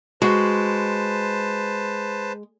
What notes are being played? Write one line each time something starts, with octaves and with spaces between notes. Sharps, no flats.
G#3 F#4 B4 C5 A5